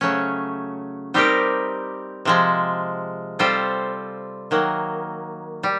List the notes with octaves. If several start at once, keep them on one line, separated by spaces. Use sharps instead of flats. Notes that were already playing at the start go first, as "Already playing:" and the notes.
C#3 F#3 A3 C#4
G3 C4 D#4 G4 A#4
C3 F3 G#3
G3 C4 F4 A4 C5
D#3 F#3 A#3
G3